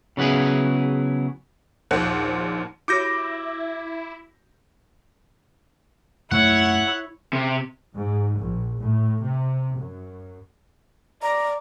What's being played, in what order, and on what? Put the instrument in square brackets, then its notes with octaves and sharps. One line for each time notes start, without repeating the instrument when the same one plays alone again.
[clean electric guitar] C#3 F#3 B3 E4 G#4
[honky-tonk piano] A#1 D#2 A#2 C5 F#5 F#6
[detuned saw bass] E4 [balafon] F#4 G4 C#5 [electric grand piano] D6 G6 A#6
[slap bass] F#2 A3 A#3 [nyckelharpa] E4 C#5 [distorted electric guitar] F#5
[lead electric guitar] C3
[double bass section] G#2
A#1
A2
C3
F#2
[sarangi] D5 [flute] A#5